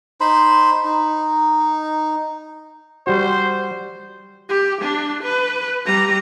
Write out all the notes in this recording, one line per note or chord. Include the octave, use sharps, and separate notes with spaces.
D#4 C5 B5 C6
D#4
G3 F#4 C5
G4
D4
B4
G3 A#5